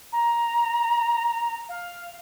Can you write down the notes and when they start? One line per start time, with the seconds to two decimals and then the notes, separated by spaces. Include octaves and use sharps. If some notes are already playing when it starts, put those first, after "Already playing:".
0.13 A#5
1.69 F5